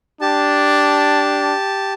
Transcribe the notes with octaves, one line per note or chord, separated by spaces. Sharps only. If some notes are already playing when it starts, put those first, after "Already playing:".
D4 G4 A5